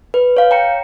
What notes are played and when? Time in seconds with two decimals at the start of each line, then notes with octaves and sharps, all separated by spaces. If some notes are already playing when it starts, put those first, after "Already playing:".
0.14 B4
0.37 C#5 F5
0.51 G5 A#5 C#7